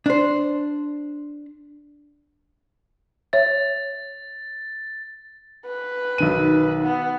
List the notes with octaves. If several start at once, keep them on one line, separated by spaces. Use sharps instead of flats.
D4 C5
C#5 E5 A6
B4
B1 D#3 D#7
B3